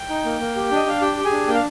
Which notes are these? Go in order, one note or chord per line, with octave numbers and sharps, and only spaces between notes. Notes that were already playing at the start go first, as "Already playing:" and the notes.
Already playing: G5
D#4
A#3
A#3
G4
D4 D#5
D4 F5
G4 G5
G4
G#4 G#5
D4
A#3 G5
F5